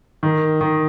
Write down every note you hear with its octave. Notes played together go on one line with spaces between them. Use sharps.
D#3
D#3